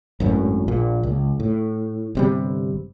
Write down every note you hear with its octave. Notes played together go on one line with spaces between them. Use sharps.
G#1 F#2 A2
A#1 A#2
C#2
A2
G1 C3 G3